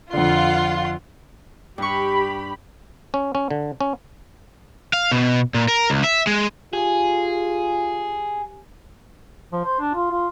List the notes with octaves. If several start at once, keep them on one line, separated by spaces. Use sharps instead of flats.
F2 D3 F4 F#5 C6
G2 G4 B5 C#6
C#4
C#4
D3
C#4
F5
B2
A#2
A#4
C#2
E5
G#3
F4 G4 G#4 G#5
F3
C5
D4
F4
F4